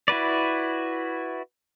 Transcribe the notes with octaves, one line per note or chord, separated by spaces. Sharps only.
E4 F#4 B4 D5